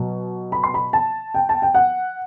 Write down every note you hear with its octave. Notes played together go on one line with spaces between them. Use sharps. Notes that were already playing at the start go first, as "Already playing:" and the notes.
Already playing: B2 F#3
B5
C6
B5
A5
G5
A5
G5
F#5